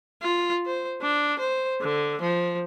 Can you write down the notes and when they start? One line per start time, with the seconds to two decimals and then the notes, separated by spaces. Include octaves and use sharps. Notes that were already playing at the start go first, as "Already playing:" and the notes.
0.22 F4
0.66 C5
1.01 D4
1.39 C5
1.81 D3
2.21 F3